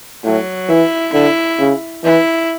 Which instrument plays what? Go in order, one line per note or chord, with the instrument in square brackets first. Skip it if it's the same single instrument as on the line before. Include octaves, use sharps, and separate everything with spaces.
[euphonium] A2 [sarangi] F#3
[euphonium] E3 [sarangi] E4
[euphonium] D3 [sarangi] E4
[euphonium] C#3
[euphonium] E3 [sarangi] E4